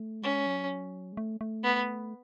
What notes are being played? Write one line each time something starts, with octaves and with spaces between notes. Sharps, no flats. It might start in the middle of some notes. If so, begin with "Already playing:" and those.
Already playing: A3
G#3 C#4
F#3
G#3
A3
A3
B3